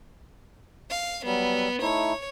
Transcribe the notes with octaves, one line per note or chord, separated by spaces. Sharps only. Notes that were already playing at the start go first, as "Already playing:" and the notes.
F5
F#3 G3 B3
A3 D#4 E4 C#5